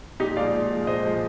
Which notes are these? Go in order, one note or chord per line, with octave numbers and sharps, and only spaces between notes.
A#2 D#4 G4
F3 G#3 D5 F5
A#2
F3 G#3
A#2 C5 D#5
F3 G#3